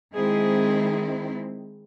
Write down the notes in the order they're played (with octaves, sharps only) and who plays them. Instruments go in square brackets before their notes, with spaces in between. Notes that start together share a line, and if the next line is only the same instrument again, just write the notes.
[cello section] D#3 G#3 C4 E4 [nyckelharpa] G#4